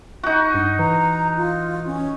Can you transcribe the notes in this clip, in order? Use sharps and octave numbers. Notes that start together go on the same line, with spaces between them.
D#4 F#4
G2
E3 A#5
F4
C#4